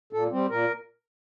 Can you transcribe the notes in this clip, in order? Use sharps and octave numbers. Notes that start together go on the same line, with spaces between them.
A#2 A4
G3 C4
A#2 A#4